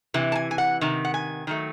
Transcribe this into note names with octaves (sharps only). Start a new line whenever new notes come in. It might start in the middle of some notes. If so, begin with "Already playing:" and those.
C3 E3
A5
G#5
G#5
F#5
C3 D#3
F#5
G#5
D#3 F#3 A3